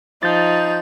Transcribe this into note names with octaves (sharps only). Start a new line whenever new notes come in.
F3 D#4 G6 A6